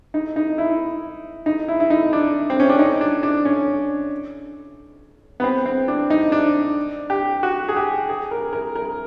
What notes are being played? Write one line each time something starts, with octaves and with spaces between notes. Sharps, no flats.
D#4
D#4
E4
D#4
E4
E4
D#4
D4
C4
C#4
D4
D#4
D4
D4
C#4
B3
C4
C4
D4
D#4
D4
G4
F#4
G#4
G4
G#4
A#4
A#4
A#4